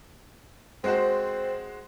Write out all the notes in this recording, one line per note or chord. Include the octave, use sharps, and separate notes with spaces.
G#3 C4 F#4 C5